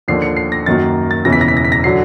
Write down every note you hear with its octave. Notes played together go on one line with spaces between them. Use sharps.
D#2 D3 F3 C7
C#7
C7
A#6
F#2 D#3 F#3 A#3 A6
A6
E1 E2 C#3 E3 A#6
B6
A#6
B6
A#6
B6
A#6
D3 F#3 C7